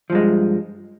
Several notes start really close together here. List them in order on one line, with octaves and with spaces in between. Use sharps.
F3 G2 G#3